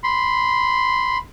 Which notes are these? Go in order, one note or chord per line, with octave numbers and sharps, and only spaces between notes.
B5 C6